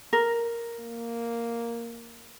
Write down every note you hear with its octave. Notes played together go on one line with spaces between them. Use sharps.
A#4
A#3